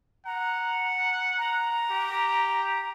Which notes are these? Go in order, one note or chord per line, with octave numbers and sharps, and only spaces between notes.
F#5 A#5
A#5
G4